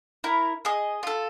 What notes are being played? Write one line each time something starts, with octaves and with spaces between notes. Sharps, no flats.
E4 A#4
G#4 D#5
F4 A4